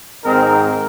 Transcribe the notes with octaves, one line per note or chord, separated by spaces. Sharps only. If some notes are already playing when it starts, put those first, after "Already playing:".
G#2 D#3 G#3 C4 D#4 A#4